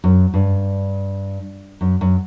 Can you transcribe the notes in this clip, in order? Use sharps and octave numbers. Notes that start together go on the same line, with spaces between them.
F#2
G2
F#2
F#2